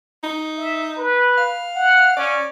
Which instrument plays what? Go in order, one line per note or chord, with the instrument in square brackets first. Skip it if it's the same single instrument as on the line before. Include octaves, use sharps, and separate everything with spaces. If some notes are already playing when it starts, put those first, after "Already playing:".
[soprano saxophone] D#4
[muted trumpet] E5
B4
[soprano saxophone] F5
[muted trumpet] F#5
[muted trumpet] C#4 [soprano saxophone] D5